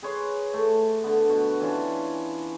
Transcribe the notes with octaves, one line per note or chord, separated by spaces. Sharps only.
G#4 B4 C#5 C6
A3 A5
D3 B3
B2 F#4
E3 C#4 D4 F4
G#5